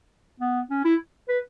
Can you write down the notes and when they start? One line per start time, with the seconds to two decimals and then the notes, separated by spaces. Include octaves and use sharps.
0.40 B3
0.70 C#4
0.85 E4
1.28 B4